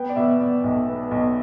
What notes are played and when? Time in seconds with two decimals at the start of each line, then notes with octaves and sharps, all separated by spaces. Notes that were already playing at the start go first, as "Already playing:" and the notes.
Already playing: B3 G5
0.09 D5
0.16 B2 E5
0.40 B2 D5
0.64 B1
0.88 B3
1.11 B1